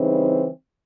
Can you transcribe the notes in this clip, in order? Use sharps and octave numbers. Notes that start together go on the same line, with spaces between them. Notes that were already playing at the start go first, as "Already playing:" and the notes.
Already playing: C#3 E3 G3 C4 D#4